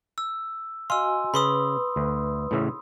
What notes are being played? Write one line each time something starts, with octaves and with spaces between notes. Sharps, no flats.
E6
F#4 D#5 F5 G#5 C6 E6
C#3 B4 B5 C6 D#6
D2
A2 C#3 E3